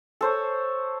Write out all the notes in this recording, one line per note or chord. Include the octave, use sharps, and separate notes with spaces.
A4 C5 C#5